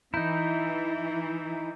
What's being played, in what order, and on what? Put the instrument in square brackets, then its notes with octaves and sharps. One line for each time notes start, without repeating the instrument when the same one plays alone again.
[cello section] E3 [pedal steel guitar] D#4 E4 [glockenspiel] A#5 G6